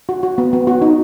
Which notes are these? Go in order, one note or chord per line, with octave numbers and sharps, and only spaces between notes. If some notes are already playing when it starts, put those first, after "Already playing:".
F#4
F#4
B3
B3
F#4
D#4